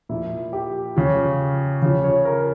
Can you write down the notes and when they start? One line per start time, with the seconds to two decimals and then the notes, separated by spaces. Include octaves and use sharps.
0.09 A#2 F3 E4
0.53 G4
0.96 C#3 F3
1.82 C#3 F3
2.04 C#5
2.25 A#4